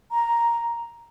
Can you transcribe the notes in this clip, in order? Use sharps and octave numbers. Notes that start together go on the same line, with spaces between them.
A#5